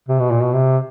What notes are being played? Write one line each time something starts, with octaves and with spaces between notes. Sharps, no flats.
C3
B2
A#2
B2
C3